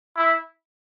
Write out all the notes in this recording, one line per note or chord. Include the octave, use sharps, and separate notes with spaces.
E4